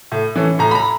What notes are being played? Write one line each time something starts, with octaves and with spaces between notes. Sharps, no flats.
A2
E3 A3 C#4
A2 A#5
B5
A#5